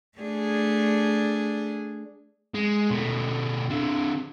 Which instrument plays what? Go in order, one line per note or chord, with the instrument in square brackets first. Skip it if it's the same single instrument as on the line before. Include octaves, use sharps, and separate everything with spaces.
[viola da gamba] A3 D4 G#4
[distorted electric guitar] G#3
B2 A3
D3 C4